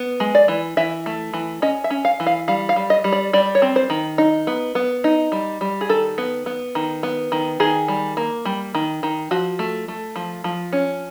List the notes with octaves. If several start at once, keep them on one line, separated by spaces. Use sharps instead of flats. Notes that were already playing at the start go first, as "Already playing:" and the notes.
Already playing: B3
G#3
D5
E3
E3 E5
A3
E3
C#4 D#5
E5
C#4
F5
E3
F5
G3 F5
F5
G3
D#5
G3
D5
G3 D5
C#5
C4
C5
D#3
D#4
B3
B3
D#4
G3
G3
G#4
D#3 A4
B3
B3
D#3
B3
D#3
D#3 G#4
G3
A#3
G3
D#3
D#3
F3 F#4
A3
A3
F3
F3
C#4